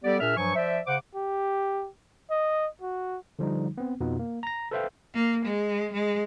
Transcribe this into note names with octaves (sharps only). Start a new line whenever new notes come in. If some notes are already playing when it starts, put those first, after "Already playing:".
G3 B3 G4 A4 D5
A#2 D4 G#4 A#4 E5 F6
G2 F3 F#3 G#5 C#6
F3 C5 D5 E5
C#3 C5 F#5 D6
G4
D#5
F#4
D3 F3 G3 D#4
B3 C4
F2 B2 B3 D#4 F4
A#3
A#5 A#6
A4 B4 C5 E5 F5 G5
A#3
G#3
G#3